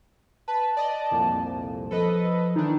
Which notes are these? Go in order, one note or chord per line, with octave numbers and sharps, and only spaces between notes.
B4 A5
D5 D#5
C2 F2 A#2
F3 A4 B4 D#5
D#3 E3 D4 D#4